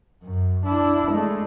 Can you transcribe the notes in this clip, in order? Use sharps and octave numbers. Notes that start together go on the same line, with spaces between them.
F#2
D4 E4
G#3 A3